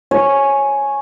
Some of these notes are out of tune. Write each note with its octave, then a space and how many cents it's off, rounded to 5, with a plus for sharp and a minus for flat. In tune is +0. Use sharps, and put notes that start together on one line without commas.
C#5 -10 G#5 +10